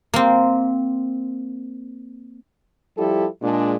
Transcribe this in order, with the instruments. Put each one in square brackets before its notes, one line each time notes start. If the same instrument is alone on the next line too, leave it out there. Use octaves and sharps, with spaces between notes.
[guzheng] A#3 C4
[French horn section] F3 G3 E4 G4 A4
A#2 G#3 D4